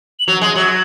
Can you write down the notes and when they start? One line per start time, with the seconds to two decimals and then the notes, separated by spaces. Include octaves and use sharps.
0.20 F#7
0.27 F#3 F7
0.42 G#3 F#7
0.55 F#3 F#7